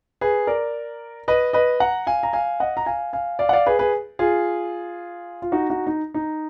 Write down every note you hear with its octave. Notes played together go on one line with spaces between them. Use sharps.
G#4 B4
A#4 D5
B4 D#5
B4 D#5
F#5 A#5
F5 G#5
A#5
F5 G#5
D#5 F#5
A#5
F5 G#5
F5 G#5
D5 F5
F#5
D5 F5
G#4 B4
G#4 B4
F4 G#4
F4
D#4 F#4
D#4 F#4
D#4
D#4